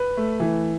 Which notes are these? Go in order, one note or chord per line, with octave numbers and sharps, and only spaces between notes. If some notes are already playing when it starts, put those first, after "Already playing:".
Already playing: B4
A3
E3